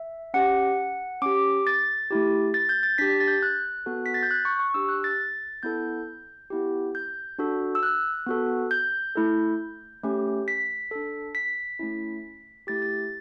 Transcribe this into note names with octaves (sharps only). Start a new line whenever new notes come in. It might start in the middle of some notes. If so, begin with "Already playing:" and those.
Already playing: E5
C#4 G4 F#5
C#4 G4 D6
A6
A3 E4 G4
A6
G6
A6
D4 G4 B6
A6
G6
F#6
B3 F#4 A4
B6
A6
G6
F#6
C#6
C#6
D4 G4 E6
F#6
A6
B3 E4 A4 G6
B3 E4 G4
G6
D4 F#4 A4
E6
F#6
B3 F#4 A4
G6
A3 E4 A4
A3 C#4 G4
B6
D4 A4
B6
A3 C#4 E4
A3 E4 G4 A6
A6